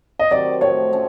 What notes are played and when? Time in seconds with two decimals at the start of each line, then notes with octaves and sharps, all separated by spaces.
0.19 D#5
0.31 C3 D#3 F#3 D5
0.61 A2 F3 A3 C#5
0.93 F3 A3 C#4